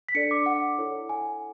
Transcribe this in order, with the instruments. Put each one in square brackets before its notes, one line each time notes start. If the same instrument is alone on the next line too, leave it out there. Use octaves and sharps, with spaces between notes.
[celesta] B6
D4 A4 D5 C#7
D6
F#5
E4 A4 C#5
G#5